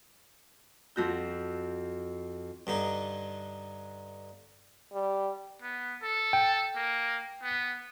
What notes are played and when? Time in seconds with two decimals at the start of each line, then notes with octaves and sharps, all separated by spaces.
0.96 F2 F#4 G6
2.67 G2 D3 D#4
4.93 G3
5.62 B3
6.02 A4
6.33 G5
6.76 A#3
7.42 B3